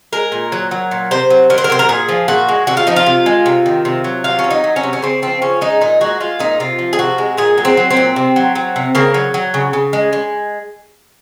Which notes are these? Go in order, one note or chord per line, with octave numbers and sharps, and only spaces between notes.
G#3 A#4
A#2
F#3
F#3
A#2
C3 C5
F#3
F#3 A#4
C5
A#4
C3 C5
A#4
A#2 G#4
F3
A#2 F#4
G#3
C3 F#4
F4
F3 D#4
F4
C3
G#3
C3
D#3
C3
F#3
C3 F4
C#4
F#3
D#4
F#3
C#4
C3
C#4
C#3 C4
F3 C4
C#3 C#4
G#3 D#4
A#2 D#4
G#3 F#4
G#3 F4
A#2 D#4
C3 F4
F3
G#4
C3 F#4
G#3
A#2 G#4
F#3
C4
F#3
C4
A#2
C3
F#3
F#3
C3
C#3 A#3
F#3
F#3
C#3
C#3
G#3
G#3